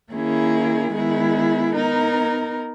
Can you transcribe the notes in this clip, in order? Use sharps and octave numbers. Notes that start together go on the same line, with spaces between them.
D#3 A#3 C#4 E4 G#4
D#3 G#3 B3 E4 G#4
B3 D#4 A#4